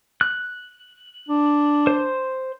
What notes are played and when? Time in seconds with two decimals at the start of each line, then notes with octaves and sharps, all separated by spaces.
0.21 F#6
1.29 D4
1.87 C5